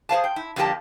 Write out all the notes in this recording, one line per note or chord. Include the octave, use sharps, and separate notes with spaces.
G#4 C5 F5 A5
G5
E4
F2 D3 G3 A#3 G4 A5